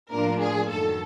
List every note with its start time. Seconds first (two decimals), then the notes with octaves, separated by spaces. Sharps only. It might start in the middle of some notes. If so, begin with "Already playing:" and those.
0.11 A2 F3 A#3 D4 F4 A#4
0.40 G#4
0.71 F#2 D#3 F#3 A4